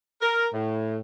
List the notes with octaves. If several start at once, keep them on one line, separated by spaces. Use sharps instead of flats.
A#4
A2